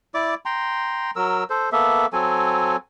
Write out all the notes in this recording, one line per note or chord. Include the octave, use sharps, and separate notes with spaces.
E4 D5 D6
G5 A#5 C6
F#3 A#4 E6
A4 C5
A#3 B3 A4 E5
F#3 C4 A4 G#5